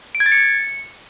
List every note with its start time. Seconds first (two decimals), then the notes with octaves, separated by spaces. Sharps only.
0.15 D7
0.20 G#6
0.26 A6
0.32 C#7